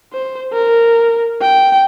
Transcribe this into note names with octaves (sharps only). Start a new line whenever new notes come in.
C5
A#4
G5